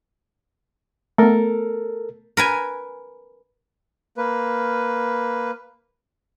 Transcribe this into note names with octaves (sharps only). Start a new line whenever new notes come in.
A3 B3 A4 A#4
A#4 B4 G#5
A#3 B4